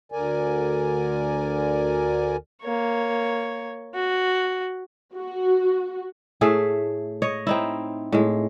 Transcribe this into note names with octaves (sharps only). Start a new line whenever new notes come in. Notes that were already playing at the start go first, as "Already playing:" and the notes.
D2 D3 A#4 D5 G#5
A#3 C#5
F#4
F#4
A2 A3 G#4 E5
C#5 D#5
C4 D#4 E4
A2 G#3